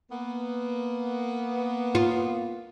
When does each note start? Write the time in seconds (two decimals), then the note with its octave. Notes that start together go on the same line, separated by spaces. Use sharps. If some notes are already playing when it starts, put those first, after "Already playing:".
0.11 A#3 B3
1.95 F4